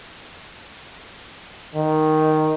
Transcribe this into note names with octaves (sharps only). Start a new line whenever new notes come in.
D#3